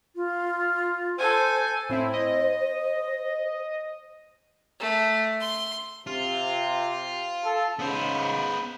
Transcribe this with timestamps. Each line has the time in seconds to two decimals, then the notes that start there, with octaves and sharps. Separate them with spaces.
0.15 F4
1.18 A4 C5 G#5
1.89 A2 C4 E4 C5
2.13 D#5
4.80 A3
5.41 C6
6.07 C3 F4
7.44 A4
7.79 G#2 C#3 B3 C5